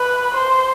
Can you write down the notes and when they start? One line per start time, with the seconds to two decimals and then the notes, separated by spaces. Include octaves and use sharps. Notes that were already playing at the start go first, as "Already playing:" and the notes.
Already playing: B4
0.35 C5